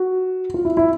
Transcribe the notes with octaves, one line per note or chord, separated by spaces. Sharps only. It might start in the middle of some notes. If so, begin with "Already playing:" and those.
Already playing: F#4
F4
E4
E4